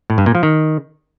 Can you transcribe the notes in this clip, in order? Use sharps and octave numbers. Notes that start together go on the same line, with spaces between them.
A2
G2
A#2
F3
D#3